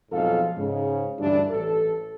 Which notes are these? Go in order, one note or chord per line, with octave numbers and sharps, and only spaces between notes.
B1 F2 G#2 A4 F5
G#2 C#3
D2 G2 E3 D4
A1 A4